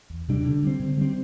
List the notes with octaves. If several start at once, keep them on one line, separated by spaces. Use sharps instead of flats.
E2
C3 G3 D4
D3
G3 C4
D3
G3 C4